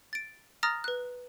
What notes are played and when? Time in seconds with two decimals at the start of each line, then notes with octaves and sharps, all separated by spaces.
0.13 A6 D7
0.63 A#5 D#6 F6 A6 A#6
0.84 B4 F#6